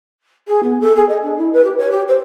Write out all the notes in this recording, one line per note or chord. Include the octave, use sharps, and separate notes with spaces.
G#4
B3
A4
G#4
D#5
D4
E4
B4
G4
C#5
G4
C5